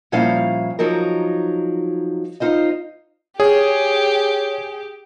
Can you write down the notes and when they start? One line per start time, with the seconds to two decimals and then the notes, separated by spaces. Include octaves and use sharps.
0.12 A#2 F3 G3 C#4 E4 F5
0.79 F3 F#3 D#4 A#4
2.40 D#4 F4 C5 D#5
3.40 G4 G#4 C#5